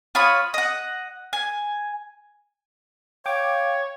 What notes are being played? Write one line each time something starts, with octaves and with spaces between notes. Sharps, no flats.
F4 C#5 B5 D#6
D#5 F#5
G#5
C#5 F5 G5 D6